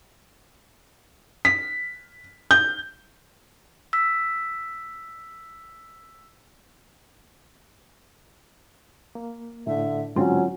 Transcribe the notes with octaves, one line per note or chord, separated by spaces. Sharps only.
B6
G6
E6 B6
A#3
A2 D3 E5
G#2 D3 F#3 C4 C#4 F4